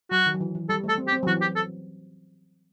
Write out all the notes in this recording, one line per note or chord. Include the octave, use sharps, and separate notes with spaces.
F#3 F#4
D#3
F#3
E3
E3
G3 A4
A3
A4
C4
G4
C4
F#3
E3 F#4
G4
A4